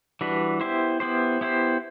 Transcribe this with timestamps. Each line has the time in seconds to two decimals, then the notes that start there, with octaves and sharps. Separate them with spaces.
0.21 E3 G3 D4 F#4 B4
0.61 B3 E4 G4 C5
1.00 B3 E4 G4 C5
1.41 B3 E4 G4 C5